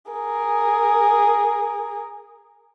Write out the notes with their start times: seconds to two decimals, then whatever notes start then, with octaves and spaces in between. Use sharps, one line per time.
0.11 G#4 A#4